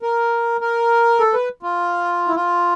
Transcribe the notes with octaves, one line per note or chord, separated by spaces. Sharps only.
A#4
A#4
A4
B4
F4
E4
F4